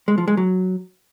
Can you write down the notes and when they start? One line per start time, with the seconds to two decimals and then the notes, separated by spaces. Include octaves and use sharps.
0.08 G#3
0.18 F3
0.28 G#3
0.37 F#3